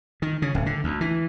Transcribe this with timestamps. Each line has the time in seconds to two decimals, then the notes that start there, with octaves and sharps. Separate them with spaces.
0.22 D#3
0.42 C#3
0.55 D1
0.66 D3
0.84 D2
1.01 E3